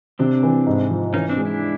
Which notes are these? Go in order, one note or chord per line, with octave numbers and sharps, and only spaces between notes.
C3 C4 D4
E3
G#2
F3
E3 C#4 D#4
C4 D4
G#3
D4 E4